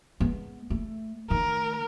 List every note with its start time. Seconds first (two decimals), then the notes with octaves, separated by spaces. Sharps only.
0.20 G#3 B3
0.70 A3
1.30 D#3 A3 A#4